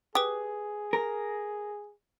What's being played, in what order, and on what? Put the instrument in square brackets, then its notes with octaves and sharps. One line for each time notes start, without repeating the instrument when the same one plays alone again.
[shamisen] G4 [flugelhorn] G#4 [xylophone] B4 D#6
[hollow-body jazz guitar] A#4